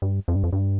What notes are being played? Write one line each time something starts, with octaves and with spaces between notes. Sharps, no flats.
G2
F2
G2
F2
G2